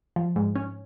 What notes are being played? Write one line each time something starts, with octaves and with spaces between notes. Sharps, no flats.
F3
G#2
C#4